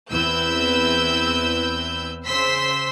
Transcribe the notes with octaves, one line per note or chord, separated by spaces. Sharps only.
E2 C4 E4 B4 E6 G6
C#3 C5 C6 E6 B6